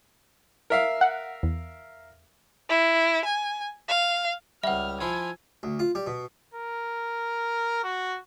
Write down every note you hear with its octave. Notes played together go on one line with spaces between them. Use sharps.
A#4 E5 F5
F#5
E2
E4
G#5
F5
C#2 G3 E5 F#5 F6
F3 E4 F4 G#5
D2
F4
G3
B2
A#4
F#4